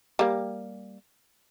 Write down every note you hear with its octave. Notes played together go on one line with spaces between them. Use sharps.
G3 A#3